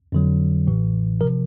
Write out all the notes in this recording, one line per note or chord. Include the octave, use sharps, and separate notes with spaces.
F2 D3 F#3
A1 A2 E3
C3 F3 A#4